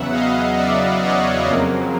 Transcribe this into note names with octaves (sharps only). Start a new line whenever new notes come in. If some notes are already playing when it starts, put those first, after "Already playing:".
Already playing: E2 C#3 F#3 B3 E5 F#5
D#5 F5
D5 E5
C#5 D#5
F2 C#3 F#3 A#3